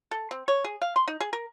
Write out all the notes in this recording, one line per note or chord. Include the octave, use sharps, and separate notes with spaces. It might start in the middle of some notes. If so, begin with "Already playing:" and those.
A4
C4
C#5
G#4
F5
C6
D#4
G#4
A#4